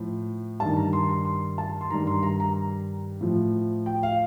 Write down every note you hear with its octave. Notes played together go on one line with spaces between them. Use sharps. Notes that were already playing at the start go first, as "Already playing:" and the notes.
Already playing: A2 F3
G2 D#3 A5
A#5
C6
C6
C6
A5
C6
G2 D#3 A#5
C6
A#5
A#5
A2 F3
G5
F5